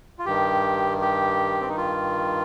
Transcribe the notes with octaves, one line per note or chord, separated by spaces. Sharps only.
F4
G2 D#3 G4
G4
C4
D#4
F4